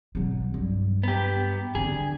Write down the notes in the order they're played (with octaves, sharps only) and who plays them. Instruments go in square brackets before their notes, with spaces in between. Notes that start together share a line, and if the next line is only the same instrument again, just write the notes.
[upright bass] B1 F#3
G2
[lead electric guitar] B3 G4
[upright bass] D3 [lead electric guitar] G#4